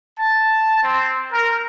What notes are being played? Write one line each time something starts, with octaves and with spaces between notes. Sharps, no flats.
A5
C4
A#4